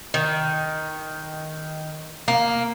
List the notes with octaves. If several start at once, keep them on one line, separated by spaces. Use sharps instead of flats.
D#3
A#3